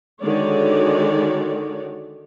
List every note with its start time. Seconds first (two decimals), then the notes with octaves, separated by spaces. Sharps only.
0.22 D3 D#3 G#3 F#4 C#5 D5